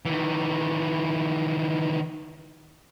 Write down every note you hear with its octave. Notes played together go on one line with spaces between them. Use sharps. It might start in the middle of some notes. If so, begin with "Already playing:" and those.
D#3 E3